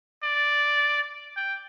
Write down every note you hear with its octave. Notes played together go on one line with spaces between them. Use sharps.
D5
G5